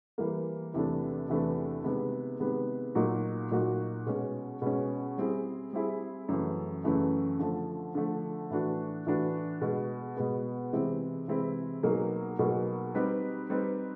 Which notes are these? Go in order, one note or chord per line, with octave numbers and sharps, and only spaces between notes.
E3 G3 A#3
E2 C3 E3 A3 D4
E2 C3 E3 A3 D4
C3 D#3 G#3 B3
C3 D#3 G#3 B3
A#2 F#3 A#3 D#4 F#4
A#2 F#3 A#3 D#4 F#4
B2 G#3 C#4
B2 G#3 C#4
G3 C4 E4 G#4
G3 C4 E4 G#4
F#2 C#3 E3 A3
F#2 C#3 E3 A3
D3 F3 A3
D3 F3 A3
A2 E3 A3 D4 F#4
A2 E3 A3 D4 F#4
B2 G#3 B3
B2 G#3 B3
C3 E3 G#3 C4 E4
C3 E3 G#3 C4 E4
B2 F#3 A#3 D#4 G#4
B2 F#3 A#3 D#4 G#4
G3 C4 D#4 G4 B4
G3 C4 D#4 G4 B4